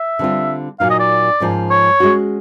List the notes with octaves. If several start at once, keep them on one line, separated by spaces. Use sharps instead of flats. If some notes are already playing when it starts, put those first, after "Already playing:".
Already playing: E5
D3 G3 C4 F4
A#2 F#3 A#3 D#4 F5
D#5
D5
G#2 F3 A#3 C#4
C#5
G#3 C#4 F#4